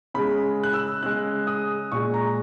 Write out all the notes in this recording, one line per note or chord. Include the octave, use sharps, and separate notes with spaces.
C#3 G#3 B5
F#6
E6
C#3 G#3 F#6
D#6
A#2 G#3 C#6
A#5